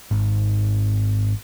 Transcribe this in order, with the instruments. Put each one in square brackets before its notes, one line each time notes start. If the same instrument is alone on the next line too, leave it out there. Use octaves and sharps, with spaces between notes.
[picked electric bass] G#1